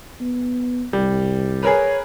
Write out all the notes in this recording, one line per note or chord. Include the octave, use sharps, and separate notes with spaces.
B3
C2 G3
G#4 A#4 B4 C#5